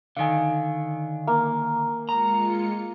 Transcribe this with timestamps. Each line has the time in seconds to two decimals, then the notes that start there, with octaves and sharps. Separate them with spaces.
0.17 D3 D#3 F5 G#5
1.27 A#3
2.09 G#3 F4 A#5 C#7